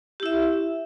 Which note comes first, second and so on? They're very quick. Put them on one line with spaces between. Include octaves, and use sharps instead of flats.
G4 E4 E5